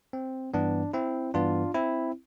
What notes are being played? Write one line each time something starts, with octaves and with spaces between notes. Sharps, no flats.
C4
G2 E3 B3 D4
C4 E4
G2 E3 B3 D4 F4
C4 E4